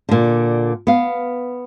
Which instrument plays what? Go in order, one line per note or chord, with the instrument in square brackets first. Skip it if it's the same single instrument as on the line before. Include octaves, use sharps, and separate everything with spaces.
[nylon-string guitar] A#2 D3
B3 F5